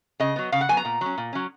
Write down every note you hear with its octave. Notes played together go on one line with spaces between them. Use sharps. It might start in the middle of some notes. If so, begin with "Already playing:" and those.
C#3 D#5
F#3 B3
C#3 F5
F#5
F#3 B3 G#5
A#5
A#2
F#3 C#4
A#2
F#3 C#4